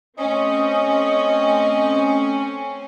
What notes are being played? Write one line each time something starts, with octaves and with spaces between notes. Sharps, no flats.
A3 C4 C#4 D#5